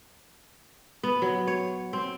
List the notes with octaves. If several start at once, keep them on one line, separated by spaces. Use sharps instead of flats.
B3
F#3
C#5
C4